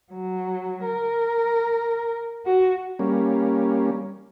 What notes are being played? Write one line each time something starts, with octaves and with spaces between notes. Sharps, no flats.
F#3
A#4
F#4
G3 A#3 C#4